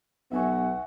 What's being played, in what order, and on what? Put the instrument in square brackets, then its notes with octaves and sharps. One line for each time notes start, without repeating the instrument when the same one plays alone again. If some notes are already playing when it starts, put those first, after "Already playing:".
[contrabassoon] B1 [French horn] B3 [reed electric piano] E5 G#5 C#6 [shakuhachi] F#5